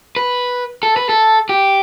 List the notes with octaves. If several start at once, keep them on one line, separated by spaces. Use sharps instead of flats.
B4
A4
B4
A4
G4